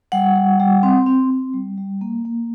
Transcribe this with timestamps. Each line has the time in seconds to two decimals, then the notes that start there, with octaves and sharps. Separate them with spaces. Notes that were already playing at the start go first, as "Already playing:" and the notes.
0.12 G3 F#5
0.36 G3
0.60 G3
0.83 C4
1.06 C4
1.31 C4
1.54 G3
1.77 G3
2.01 A#3
2.25 A#3